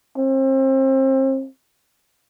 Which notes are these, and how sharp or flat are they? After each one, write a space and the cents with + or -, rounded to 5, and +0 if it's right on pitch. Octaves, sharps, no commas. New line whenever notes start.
C4 +35